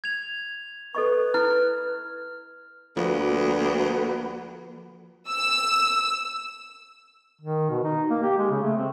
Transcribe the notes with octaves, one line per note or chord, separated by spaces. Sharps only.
G#6 F7
A4 B4 D#5 C#6
E4 F6
D2 F3 A#3 F#4 B4
E6
D#3
B2
D#4
A#3
G4
G#3
C#3
A3
C4